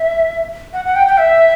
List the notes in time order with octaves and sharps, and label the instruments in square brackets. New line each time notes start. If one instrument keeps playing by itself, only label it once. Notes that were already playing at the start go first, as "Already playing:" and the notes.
Already playing: [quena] E5
F#5
F#5
G5
G5
E5